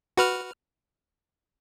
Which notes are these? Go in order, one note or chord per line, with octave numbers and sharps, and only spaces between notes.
F#4 B4 F6